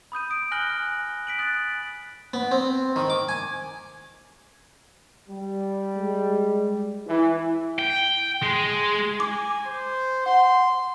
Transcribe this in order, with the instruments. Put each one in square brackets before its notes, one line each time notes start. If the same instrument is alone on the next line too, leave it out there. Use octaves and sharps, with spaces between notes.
[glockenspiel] B5 D#6 G6 D#7
D#6 D7
G#5 F6 F#6 A#6 F#7 G7
F6 F#6
B6 D7 F#7
D#6 F#6 A6 F#7
[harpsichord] B3
C4
D#3
D6
G#5
[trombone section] G3
[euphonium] G#3
[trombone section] E3 [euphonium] E4
[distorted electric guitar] G5
G#3
[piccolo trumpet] G#5 [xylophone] D6
[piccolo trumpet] C5
[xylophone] F#5 [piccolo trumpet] C6